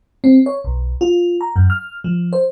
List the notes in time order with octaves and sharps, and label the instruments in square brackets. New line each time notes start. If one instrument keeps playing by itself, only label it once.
[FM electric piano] C4
C#5
B1
F4
A#5
F#2
F6
F3
C5